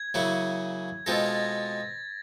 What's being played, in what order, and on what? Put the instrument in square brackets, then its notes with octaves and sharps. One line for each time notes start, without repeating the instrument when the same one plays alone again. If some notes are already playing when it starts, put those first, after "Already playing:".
Already playing: [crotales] G#6
[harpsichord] C#3 F#3 A#3 C#4 E4
[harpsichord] B2 G#3 C4 F4 A4 [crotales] A#6
[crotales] A6
G#6
A6